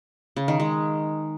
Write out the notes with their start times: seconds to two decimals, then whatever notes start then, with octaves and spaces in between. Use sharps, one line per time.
0.36 C#3
0.48 D#3
0.60 G#3